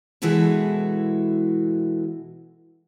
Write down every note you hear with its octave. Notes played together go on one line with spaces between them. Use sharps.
B2 E3 G#3 E4 F#4 A4